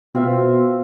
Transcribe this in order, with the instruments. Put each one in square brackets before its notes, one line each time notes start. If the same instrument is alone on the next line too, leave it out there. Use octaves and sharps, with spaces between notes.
[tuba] B2 [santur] C4 F4 E5